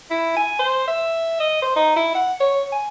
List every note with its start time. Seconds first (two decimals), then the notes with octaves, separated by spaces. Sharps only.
0.10 E4
0.36 G#5
0.59 C5
0.88 E5
1.40 D#5
1.62 C5
1.76 D#4
1.96 E4
2.15 F#5
2.40 C#5
2.72 G#5